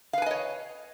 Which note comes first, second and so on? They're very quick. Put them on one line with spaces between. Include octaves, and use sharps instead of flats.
F5 B4 G#5 D#5 C#5